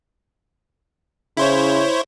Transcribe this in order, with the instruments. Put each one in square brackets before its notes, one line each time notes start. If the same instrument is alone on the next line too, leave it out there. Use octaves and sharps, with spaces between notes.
[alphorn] C#3 [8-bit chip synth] E4 C5 C#5